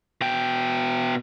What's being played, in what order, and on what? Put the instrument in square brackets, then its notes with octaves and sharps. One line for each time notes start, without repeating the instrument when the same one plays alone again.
[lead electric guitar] B2 G5